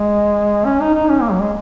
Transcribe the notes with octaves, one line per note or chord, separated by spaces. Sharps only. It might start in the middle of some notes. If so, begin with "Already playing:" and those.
Already playing: G#3
C#4
D#4
D#4
C#4
A#3
F#3
G#3